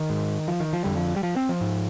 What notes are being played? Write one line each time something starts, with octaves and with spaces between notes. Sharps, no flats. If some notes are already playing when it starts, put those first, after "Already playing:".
Already playing: D#3
G#2
F3
D#3
F3
F2 D3 G3
F3
G3
F3
C4
F3
G#2